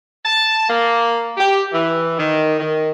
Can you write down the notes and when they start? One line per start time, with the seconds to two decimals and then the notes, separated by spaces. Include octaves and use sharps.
0.25 A5
0.69 A#3
1.37 G4
1.72 E3
2.18 D#3
2.59 D#3